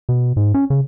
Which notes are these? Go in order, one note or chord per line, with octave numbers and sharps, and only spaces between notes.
B2
G#2
C#4
C#3